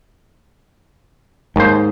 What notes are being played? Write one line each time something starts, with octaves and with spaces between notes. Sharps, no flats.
D#2 G#2 C5